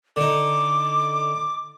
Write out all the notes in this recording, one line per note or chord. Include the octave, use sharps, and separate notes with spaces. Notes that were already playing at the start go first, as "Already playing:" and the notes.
D3 D#4 D6